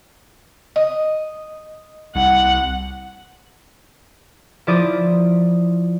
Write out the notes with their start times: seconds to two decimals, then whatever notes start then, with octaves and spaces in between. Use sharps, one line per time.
0.76 D#5
2.15 C2 F#5
4.67 F3 E4 D5 C6 D#6